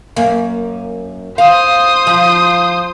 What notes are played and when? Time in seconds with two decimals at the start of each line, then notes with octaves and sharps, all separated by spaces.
0.16 F#2 A#3
1.38 C5 F5 D#6
2.07 F3